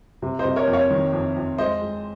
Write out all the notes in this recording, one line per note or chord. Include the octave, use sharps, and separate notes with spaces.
C3
C5 D#5
C3
A#4 C#5
F2
C#5 F5
D#3
F2
F2
G#3 C5 D#5
G#3